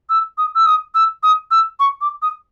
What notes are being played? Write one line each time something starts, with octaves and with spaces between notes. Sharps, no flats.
E6
D#6
E6
D#6
E6
D#6
E6
C#6
D6
D#6